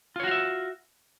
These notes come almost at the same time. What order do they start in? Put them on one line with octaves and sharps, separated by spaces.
F4 C#5 F#4 F5 E5